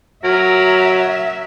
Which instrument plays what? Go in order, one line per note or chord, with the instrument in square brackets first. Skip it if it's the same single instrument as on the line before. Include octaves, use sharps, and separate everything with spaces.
[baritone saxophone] F#3 [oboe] A#4 [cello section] E5